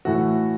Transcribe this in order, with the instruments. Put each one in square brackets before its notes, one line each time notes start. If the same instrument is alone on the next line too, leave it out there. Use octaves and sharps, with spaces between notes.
[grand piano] A2 E3 A3 F#4